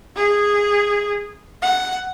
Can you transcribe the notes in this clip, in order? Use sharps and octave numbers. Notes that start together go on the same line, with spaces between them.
G#4
F#5